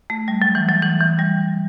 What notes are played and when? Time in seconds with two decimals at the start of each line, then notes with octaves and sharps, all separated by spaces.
0.10 A3
0.28 G3
0.42 F#3
0.55 E3
0.69 F#3
0.82 E3
1.01 E3
1.19 G3